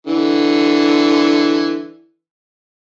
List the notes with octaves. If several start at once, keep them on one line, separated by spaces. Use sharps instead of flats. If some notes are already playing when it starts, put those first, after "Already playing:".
D3 E3